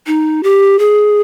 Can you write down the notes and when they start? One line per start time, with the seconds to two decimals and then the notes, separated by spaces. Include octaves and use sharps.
0.07 D#4
0.43 G4
0.79 G#4